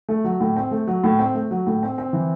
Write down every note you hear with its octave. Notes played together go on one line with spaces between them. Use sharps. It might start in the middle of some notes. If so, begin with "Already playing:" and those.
A3
F#3
A2
C4
A3
F#3
A2
C4
A3
F#3
A2
C4
C4
E3